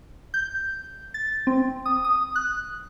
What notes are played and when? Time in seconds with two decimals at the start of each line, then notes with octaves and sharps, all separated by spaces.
0.34 G6
1.14 A6
1.47 C4
1.86 D#6
2.04 D#6
2.36 F#6